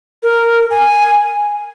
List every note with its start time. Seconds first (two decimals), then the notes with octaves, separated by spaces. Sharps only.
0.23 A#4
0.70 G#5